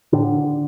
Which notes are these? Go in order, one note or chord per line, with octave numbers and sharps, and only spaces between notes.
A2 D3 D4